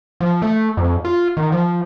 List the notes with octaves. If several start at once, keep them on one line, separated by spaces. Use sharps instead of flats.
F3
A3
F2
F4
D#3
F3